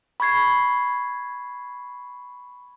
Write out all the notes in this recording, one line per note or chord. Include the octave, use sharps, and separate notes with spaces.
B5 C#6 G#6 C7